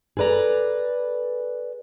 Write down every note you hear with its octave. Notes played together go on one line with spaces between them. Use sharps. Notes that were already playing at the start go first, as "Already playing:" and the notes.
G#4 A4 B4 D5 A#5